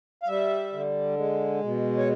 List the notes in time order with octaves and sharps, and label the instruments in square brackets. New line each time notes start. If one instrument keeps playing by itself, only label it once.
[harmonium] F5
G3 E5
D3
G#3
B2
C#5